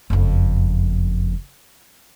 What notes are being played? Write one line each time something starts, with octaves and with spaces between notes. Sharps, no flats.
F#1 F2